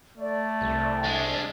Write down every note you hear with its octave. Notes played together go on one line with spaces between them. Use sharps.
A3 D5
C2
G#3 D4